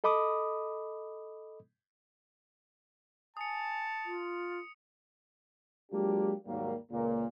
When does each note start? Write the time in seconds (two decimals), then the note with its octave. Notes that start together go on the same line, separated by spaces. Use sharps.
0.04 A4 D#5 B5 D6 D#6
3.37 G#5 A5 D#6 C#7
4.05 F4
5.92 F#3 G#3 A#3 D4 F4 G4
6.46 D#2 G#2 F#3 G3 A#3
6.92 C#2 A#2 A#3